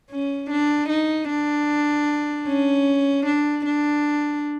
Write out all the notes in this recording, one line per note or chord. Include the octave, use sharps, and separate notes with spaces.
C#4
D4
D#4
D4
C#4
D4
D4